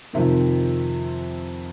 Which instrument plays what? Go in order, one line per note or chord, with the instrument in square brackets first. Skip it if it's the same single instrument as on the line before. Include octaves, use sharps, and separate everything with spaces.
[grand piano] F2 C3 D#3